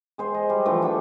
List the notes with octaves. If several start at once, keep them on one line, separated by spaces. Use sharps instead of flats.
G#3 G#4 C5
D#5
G3
D3 E3 F3 A3
D4 A4 G5